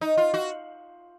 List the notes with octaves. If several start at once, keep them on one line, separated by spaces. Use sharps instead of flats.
D#4
F4
F#4